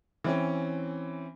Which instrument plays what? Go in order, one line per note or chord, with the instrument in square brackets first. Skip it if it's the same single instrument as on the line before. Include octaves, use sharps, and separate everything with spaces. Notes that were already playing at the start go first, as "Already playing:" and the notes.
[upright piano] E3 C4 C#4